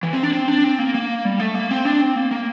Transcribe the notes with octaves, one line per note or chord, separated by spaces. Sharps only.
E3
C4
D4
C4
D4
C4
A#3
A#3
G3
A3
A#3
C4
D4
C4
A#3
A#3